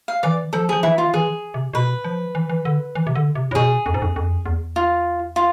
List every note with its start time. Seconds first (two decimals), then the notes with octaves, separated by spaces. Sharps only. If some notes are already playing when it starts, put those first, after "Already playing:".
0.08 F5
0.23 E3 D5
0.53 F3 A4
0.69 F3 G#4
0.83 E3 E4
0.98 F4
1.14 E3 G#4
1.54 C3
1.73 B2 B4
2.04 F3
2.35 E3
2.49 E3
2.65 D3
2.95 E3
3.07 C3
3.15 D3
3.35 C3
3.51 A2
3.55 B2 G#4
3.86 F2
3.94 G#2
4.02 F2
4.16 F2
4.46 E2
4.76 F4
5.36 F4